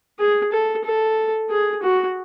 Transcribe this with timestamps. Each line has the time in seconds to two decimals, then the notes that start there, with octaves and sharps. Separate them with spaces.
0.19 G#4
0.53 A4
0.84 A4
1.50 G#4
1.83 F#4